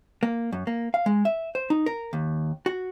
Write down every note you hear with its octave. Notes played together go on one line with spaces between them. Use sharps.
A#3
F#2
A#3
F5
G#3
E5
C5
D#4
A#4
D#2
F#4